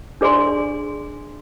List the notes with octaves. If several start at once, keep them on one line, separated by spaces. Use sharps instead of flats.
D4 G#4 D5 G#5 C6